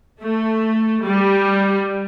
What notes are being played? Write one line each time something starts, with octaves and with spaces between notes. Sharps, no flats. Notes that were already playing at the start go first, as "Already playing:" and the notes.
A3
G3